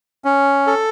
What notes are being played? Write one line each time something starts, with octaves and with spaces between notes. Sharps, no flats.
C#4
A4